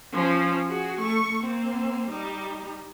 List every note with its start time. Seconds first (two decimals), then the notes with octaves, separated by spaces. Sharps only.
0.13 F3 C#4
0.68 F#4 G#4
1.00 A3 C#6
1.42 A#3 C4
2.09 G3 D#4